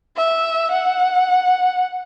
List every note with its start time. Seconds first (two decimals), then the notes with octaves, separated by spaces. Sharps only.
0.16 E5
0.71 F#5